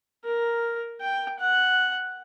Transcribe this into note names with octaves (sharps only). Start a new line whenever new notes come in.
A#4
G5
F#5